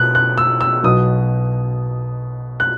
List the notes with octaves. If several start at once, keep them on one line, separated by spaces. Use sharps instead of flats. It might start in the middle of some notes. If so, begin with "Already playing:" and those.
Already playing: B2 F#6
F#6
E6
E6
B1 B2 F#3 D#6
F#6